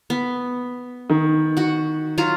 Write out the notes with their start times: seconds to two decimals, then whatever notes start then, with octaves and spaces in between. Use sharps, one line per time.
0.10 B3
1.10 D#3
1.57 F#4 F#5
2.18 F#3 F4 A#5